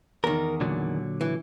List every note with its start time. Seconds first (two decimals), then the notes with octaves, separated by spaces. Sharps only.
0.24 E2 D#3 A#4
0.61 A#2 D3 F#3
1.21 E3